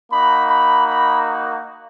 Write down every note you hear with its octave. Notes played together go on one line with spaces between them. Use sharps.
A#3 D#4 F#4 B5
B5
B5